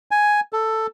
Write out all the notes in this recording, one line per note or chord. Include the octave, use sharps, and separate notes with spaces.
G#5
A4